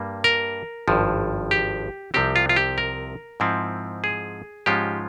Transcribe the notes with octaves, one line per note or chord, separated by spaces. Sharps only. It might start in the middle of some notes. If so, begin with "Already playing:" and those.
Already playing: G2 G3 A#3
A#4
G#1 G2 F3
G4
C2 C3 F3 C4 G4
F4
F4
G4
A#4
G#2 F3 C4 E4
G#4
G#2 F3 G#3 C#4 F4 G4